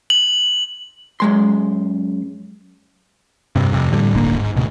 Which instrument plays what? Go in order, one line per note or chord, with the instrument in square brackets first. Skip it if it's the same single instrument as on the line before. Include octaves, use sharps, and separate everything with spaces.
[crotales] F#7
[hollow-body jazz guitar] F#2 G#3 C6
[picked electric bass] G2 C3
F2 C3
A2 D3 F3 G3
D1 G1 D3 A#3
G#2
D2 B2